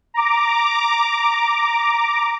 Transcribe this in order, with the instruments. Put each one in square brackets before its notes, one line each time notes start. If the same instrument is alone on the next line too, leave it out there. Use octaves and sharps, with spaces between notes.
[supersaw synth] A#5 D6